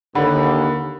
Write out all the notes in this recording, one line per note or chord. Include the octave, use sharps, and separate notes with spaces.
D#2 D3 F#5 B5